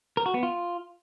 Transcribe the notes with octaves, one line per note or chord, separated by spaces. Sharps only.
A#4
F#4
B3
F4